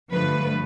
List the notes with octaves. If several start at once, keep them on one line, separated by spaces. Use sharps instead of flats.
G2 D3 F3 A3 B4